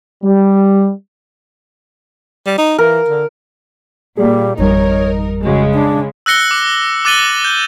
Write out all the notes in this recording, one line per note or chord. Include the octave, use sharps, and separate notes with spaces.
G3
G3
D#4
E3 A#4
D3
A#2 G3 G#4
G#1 F2 G3 D#4 A#4 C#5
C#3 G#3 F#4
D4
E6 F#6 A#6 C#7 G7
D6
D6 F#6 A6 D#7 F#7 G7
G6